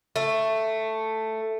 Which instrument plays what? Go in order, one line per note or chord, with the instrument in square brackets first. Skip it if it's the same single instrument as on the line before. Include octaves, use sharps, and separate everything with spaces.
[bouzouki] A3